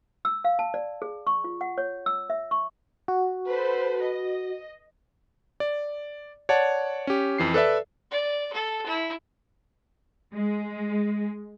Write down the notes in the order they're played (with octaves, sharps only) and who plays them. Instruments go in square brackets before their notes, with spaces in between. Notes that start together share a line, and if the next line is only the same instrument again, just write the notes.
[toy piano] E6
F5
A5
D5
G#4
C#6
F4
F#5
C#5
E6
E5
C#6
[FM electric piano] F#4
[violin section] A4 B4 C5
D#5
[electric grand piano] D5
C#5 D5 F#5 A5
C#4 G4
F2 E3 C7
A4 B4 D5 E5
[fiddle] D5
A4
E4
[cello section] G#3